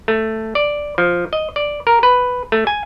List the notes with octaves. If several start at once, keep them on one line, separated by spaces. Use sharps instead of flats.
A3
D5
F3
D#5
D5
A#4
B4
A3
G#5